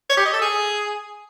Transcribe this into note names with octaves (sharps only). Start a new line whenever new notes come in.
C#5
G4
D#5
A4
G#4